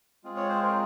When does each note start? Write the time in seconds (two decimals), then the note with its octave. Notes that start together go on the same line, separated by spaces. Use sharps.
0.24 G#3 C4 F4 G#4
0.36 C#5
0.49 C5
0.63 A#4